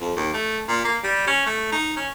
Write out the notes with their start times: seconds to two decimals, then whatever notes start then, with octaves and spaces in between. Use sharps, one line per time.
0.01 F2
0.17 D#2
0.34 A3
0.68 A#2
0.85 A#3
1.03 G3
1.27 C#4
1.46 A3
1.72 D#4
1.97 C#4